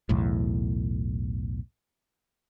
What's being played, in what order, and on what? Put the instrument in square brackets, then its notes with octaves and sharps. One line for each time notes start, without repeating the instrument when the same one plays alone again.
[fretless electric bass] B1 E2 A2